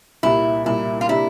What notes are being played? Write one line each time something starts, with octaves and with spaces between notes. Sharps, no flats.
C2 A#2 G3 E4
C2 A#2 G3 E4
F4
C3 G3 A#3 D4 E4